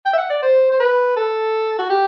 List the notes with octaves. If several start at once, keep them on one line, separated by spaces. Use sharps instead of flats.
G5
E5
F#5
D5
C5
C5
B4
A4
F#4
G4